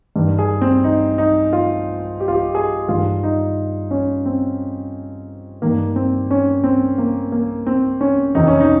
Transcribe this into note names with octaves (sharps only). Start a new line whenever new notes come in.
G2 D#3
G#4
C4
D#4
D#4
F4
G4
F4
G4
G#4
G2 D#3 F4
D#4
C#4
C4
G2 D#3 A#3
C4
C#4
C4
A#3
A#3
C4
C#4
F2 C3 D#3 D#4
C#4
D#4